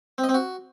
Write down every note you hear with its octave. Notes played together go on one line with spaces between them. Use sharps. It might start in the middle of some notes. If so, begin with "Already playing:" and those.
C4
D#5
C4
F#4